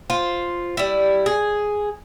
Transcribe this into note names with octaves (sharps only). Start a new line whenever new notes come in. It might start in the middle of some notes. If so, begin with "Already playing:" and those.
F4 C5
G3 E4
G#4